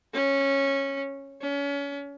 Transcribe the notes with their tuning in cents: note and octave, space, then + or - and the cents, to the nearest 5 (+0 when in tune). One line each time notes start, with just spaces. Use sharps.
C#4 -10
C#4 +30